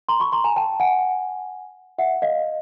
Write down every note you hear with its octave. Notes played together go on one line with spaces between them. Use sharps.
A#5 C6
B5 C#6
A#5 C6
G#5 A#5
G5 A5
F#5 G#5
E5 F#5
D#5 F5